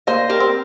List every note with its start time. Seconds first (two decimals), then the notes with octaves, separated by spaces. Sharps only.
0.07 A#3 C5 D#5
0.29 G4 A#4
0.40 C4